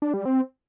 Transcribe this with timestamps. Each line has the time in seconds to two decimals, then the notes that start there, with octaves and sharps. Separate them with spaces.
0.02 D4
0.14 G3
0.25 C4